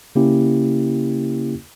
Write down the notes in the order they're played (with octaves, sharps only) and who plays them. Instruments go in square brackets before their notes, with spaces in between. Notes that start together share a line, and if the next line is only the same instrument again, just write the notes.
[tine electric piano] C#3 A#3 C#4 E4 G4